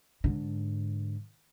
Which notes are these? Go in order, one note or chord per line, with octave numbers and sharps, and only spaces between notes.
G#2 D3